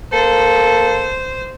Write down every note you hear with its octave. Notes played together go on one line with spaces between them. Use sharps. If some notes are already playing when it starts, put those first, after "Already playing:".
A#3 A4 C5